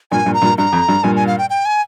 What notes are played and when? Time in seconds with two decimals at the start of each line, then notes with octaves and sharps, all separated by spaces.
0.12 G2 A#2 G#5
0.26 G2 A#2
0.34 A#5
0.42 G2 A#2
0.58 G2 A#5
0.72 F2
0.88 G2
1.04 G2 A#2 G#5
1.16 G#5
1.27 F5
1.38 G5
1.50 G5
1.65 G#5